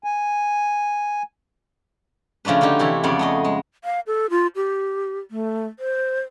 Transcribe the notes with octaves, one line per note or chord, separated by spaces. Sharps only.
G#5
C#3 F3 A3 D4 B4
D3 F3 D#4 G4
C3 E3 E4 A4 C#5
F2 C#3 B3 D5 F#5
A3 G#4 D#5
G#3
F5
A4
F4
G4
A3
C5